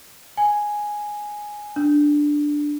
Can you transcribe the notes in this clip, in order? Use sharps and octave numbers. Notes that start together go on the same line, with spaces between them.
G#5
D4